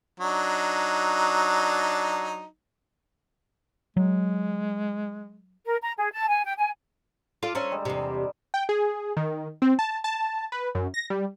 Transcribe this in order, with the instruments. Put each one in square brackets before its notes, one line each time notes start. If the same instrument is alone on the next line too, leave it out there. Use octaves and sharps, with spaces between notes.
[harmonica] F#3 D4 D#4
[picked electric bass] F#3 [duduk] G#3
[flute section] A#4
A#5
G#4
A5
G#5
G5
G#5
[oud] F4 A4 D5
[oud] C#4 D4 C5 [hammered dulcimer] A4 A#5
[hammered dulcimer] D3 G3 G#3
[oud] E2 C3
[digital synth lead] G5
G#4
D#3
C4
A5
A5
B4
F#2
A#6
G3